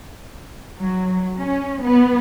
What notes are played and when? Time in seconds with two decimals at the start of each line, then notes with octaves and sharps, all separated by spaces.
0.79 F#3
1.38 C#4
1.82 B3